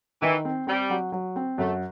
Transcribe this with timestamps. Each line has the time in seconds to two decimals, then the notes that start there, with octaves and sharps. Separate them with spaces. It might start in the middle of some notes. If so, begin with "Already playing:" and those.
0.22 D#3 E3
0.45 C4
0.67 G3 C4
0.90 F#3
1.12 F#3
1.36 C4
1.58 F#2 A3